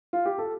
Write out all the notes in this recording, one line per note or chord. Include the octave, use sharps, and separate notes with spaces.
F4
G4
A4